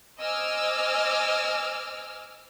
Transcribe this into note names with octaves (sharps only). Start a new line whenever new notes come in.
C5 D#5 G#5 D6 E6 F6